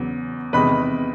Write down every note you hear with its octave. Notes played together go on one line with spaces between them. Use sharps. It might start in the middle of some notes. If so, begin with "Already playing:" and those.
Already playing: E2 C#3 F#3
E2 C3 D#3 G#3 B4 B5